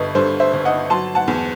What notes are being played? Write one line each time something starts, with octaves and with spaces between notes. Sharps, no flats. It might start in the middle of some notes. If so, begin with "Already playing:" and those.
Already playing: G1 G2 A4 B4 D#5
G2 A4 C5
C5 E5
G1
D#5 F#5
F#3 A5 C6
F#5 A5
E2